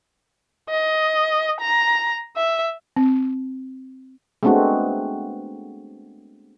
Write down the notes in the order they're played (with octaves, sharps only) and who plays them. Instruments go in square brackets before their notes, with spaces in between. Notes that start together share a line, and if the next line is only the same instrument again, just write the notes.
[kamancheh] D#5
A#5
E5
[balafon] C4
[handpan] G#3 A3 B3 C4 D4 F#4